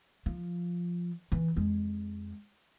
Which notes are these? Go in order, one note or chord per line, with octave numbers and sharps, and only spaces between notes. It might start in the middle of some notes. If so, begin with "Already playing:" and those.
F3
E3
F2 G#3